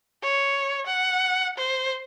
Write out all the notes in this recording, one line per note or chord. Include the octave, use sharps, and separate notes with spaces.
C#5
F#5
C5